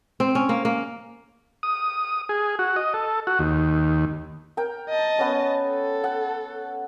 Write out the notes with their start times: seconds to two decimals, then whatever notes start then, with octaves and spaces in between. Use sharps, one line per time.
0.20 C4
0.35 C#4
0.49 A#3
0.65 A#3
1.63 D#6
2.29 G#4
2.59 F#4
2.76 D#5
2.94 A4
3.27 F#4
3.39 D#2
4.57 A#4 G5
4.89 D#5 A5
5.19 B3 C#4
5.69 A4
6.04 F#5